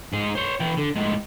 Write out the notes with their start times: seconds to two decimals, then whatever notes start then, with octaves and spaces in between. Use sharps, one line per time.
0.13 G#2 G#4
0.35 C5 C#5
0.60 E3 G5
0.77 D3
0.96 A2 G#3